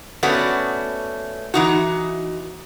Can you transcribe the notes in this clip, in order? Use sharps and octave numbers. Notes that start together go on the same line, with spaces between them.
A3 B3 C#4 F#4 B4 D5
E3 D#4 F#4